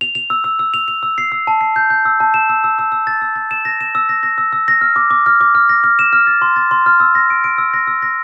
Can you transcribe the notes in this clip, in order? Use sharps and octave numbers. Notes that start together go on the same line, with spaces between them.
F7
F7
E6
E6
E6
F7
F7
E6
C7
E6
A5
C7
G6
G6
E6
A5
E7
E6
E6
E6
E6
A6
E6
A6
E7
A#6
E7
E6
A#6
A#6
E6
E6
A#6
F6
D6
D6
F6
D6
F6
A#6
F6
E7
F6
A6
C6
A6
C6
F6
E6
A#6
D7
D7
E6
A#6
E6
A#6